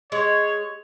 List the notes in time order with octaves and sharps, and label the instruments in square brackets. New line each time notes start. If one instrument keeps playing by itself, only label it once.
[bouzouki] G#3 [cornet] C#5